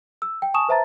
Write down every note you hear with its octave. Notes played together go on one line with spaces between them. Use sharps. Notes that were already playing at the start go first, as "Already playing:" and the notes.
E6
G5
G#5 A5 C#6 D#6 E7
B4 C5 E5 A5 A#5 A6